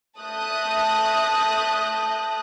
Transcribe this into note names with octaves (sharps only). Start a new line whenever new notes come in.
A3 A5 D#6 F#6 G6 A#6